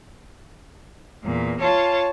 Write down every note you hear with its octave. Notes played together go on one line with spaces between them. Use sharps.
E2 A#2
F4 C#5 A5